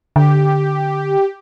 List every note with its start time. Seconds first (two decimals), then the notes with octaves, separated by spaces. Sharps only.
0.16 D3 G4